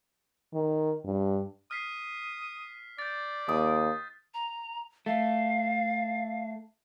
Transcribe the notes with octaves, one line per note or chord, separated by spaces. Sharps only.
D#3
G2
D#6 F6 B6 C7
D5 G6 A6
D#2 D#6
A#5
A3 F5